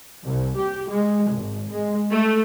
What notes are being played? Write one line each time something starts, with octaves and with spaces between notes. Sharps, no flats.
C2
G4
G#3
G#1
G#3
A3